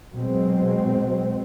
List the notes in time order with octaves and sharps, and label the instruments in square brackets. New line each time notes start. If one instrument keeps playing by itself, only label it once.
[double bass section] B2 F#3 G#3 C4